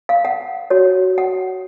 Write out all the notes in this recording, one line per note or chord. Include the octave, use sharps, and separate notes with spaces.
F5
F#5
F#4 C#5
F#5